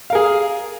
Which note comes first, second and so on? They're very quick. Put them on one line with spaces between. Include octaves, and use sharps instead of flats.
F5 A#4 G#4